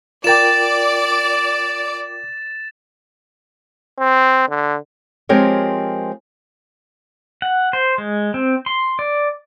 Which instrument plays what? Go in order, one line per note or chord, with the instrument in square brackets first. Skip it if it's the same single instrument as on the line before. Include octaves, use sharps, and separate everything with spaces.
[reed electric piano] F4 A#4 G5 [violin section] D5 [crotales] A6 E7
[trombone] C4
D3
[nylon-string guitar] F3 G#3 C4 G4 A#4 C#5
[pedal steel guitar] F#5
C5
G#3
C4
C6
D5